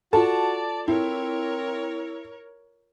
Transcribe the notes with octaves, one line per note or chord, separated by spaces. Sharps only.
F4 F#4 A4 D5 A5
C4 E4 A#4 C#5